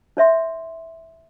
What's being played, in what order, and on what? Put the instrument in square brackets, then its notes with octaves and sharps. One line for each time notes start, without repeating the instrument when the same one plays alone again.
[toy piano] D#4 C#5 E5 C6